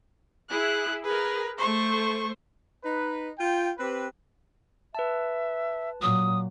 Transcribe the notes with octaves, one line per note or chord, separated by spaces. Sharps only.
E4 G#4 F#6
G#4 A#4 B4
A3 C5 C#6
D#4 B4
F4 G5
C4 G4 B4
B4 E5 A5
A#2 F#3 D#6